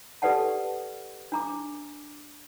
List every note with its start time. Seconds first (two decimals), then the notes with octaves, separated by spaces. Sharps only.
0.22 G4 A4 B4 D5 F#5 A5
1.32 D4 A#5 D6